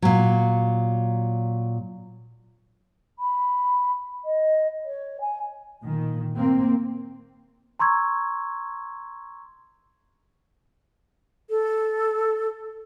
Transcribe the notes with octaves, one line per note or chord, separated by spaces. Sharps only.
A#2 F#3
B5
D#5
C#5
G#5
A#2 D#3
A#3 C4
A#5 C6 C#6 E6 G#6
A4